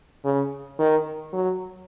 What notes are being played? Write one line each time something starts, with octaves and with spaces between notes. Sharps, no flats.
C#3
D#3
F#3